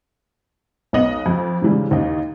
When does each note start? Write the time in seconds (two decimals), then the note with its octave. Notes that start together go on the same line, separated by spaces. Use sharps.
0.93 B1 B3 D#5 F#7
1.26 F2
1.62 G#2 C#3 E3 G3
1.91 D#2 D#4